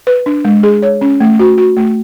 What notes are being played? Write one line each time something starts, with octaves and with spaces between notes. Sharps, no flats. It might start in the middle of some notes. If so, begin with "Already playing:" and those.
B4
D4
G#3
G#4
C#5
C#4
A3
F#4
F#4
A3